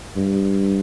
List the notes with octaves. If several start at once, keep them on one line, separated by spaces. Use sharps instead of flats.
G2